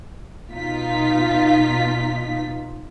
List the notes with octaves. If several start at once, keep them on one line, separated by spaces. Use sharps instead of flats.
B2 D#4 F4 B6